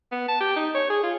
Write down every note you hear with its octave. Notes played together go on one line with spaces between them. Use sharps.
B3
A5
G4
D#4
C#5
G#4
F4